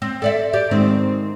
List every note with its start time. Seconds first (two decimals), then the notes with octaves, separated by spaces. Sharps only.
0.02 C4
0.22 A4 D5 E5
0.53 G4 D5
0.71 G#2 D#3 C4